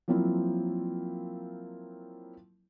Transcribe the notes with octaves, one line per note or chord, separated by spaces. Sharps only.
F3 F#3 A#3 C4 E4 F4